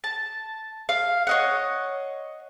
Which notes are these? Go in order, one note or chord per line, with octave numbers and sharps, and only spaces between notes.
A5
F5
C#5 D#5 F#5